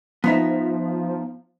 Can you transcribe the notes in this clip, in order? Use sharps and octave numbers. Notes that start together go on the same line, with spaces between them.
F3 B3 D#4 E5